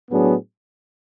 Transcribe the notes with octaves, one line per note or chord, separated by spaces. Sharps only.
A2 F#3 B3 D4 G#4